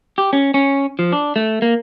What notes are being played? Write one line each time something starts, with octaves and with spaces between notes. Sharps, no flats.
G4
C#4
C#4
F3
D4
A3
A#3